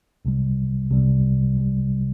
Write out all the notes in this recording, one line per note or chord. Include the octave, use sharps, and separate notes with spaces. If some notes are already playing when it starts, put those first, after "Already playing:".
C2 C3 G3
C2 C3 G3
C2 C3 G3